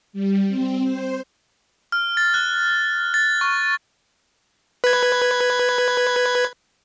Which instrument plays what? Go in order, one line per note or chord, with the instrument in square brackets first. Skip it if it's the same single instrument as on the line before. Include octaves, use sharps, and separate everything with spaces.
[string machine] G3
C4
C5
[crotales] F6
A6
F#6
A6
C#6
[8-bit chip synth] B4 G#6